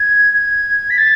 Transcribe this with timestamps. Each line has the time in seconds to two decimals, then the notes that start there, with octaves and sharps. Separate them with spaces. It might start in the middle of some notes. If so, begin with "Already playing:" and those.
Already playing: G#6
0.34 G#6
0.90 B6
0.98 A6